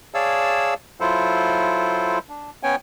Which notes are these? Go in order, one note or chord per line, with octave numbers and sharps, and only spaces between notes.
G#4 C#5 D5 F5 A5 E6
F#3 E4 F4 A4 C5
D4
B3 C#4 C#5 G5 G#5